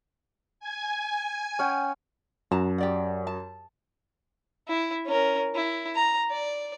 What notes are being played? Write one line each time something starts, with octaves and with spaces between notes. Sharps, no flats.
G#5 G#6
C#4 F#5 G5
F#2 F#4 A5 A#5
G4 D5 F#5
A5
E4
C#4 A#4
E4
A#5
D5